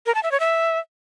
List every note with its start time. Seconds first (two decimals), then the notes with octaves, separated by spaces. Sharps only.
0.06 A#4
0.15 A5
0.23 E5
0.32 C#5
0.40 E5